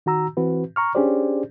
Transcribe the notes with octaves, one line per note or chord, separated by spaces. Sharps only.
D#3 F#4 A#5 E6
E3 C4 F#4 B4
A#5 C#6 F6
C#4 D4 G4 G#4 C5 D5